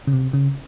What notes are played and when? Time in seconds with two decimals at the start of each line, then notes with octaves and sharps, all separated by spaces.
0.07 C#3
0.13 C3
0.33 C#3